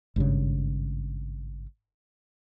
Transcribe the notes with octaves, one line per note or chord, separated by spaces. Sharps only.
G#1 G2 C#3